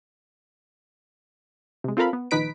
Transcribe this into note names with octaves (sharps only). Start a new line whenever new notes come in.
C3 G#3
C4 F4 A4 A#4 F5 B5
B3
A#1 D#3 D#4 B4 B6 D7